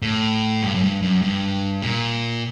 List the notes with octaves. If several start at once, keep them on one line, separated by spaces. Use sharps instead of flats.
A2
G2
F#2
G2
F#2
G2
A#2